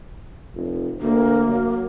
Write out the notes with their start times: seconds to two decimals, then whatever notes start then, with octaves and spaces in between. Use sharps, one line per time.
0.55 F1
1.01 D2 A#3
1.49 F#3